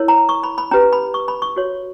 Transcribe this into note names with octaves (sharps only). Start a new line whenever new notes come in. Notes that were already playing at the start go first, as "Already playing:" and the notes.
Already playing: E4 A#4 C#5
A#5
C#6
B5
B5
C#4 G4 B4 A#5
B5
C#6
B5
C#6
F#4 C#5